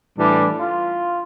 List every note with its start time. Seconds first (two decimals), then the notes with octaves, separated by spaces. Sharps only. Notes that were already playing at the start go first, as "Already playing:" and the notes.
0.17 A2 E3 G3 D4
0.59 F4